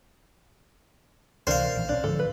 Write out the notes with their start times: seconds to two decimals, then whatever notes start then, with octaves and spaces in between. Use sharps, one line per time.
1.47 C#2 C3 E3 D4 A#4 C5 F5
1.75 A#1 D#3 E3
1.89 B1 C#4 D4
2.04 G#2 D3 F3 A4
2.19 B4